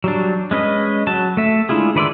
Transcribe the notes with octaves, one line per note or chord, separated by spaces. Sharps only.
F#3 G3 D4
G#3 C#4 B4 D#5
F#3 A5
A3 E5
G#3 D4 E4 F4 G#4
D#3 B4 D5 C6 E6